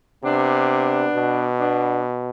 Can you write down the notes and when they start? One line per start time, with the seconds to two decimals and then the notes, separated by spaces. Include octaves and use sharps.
0.23 C3 B3 D4
1.15 B2
1.60 B3 D4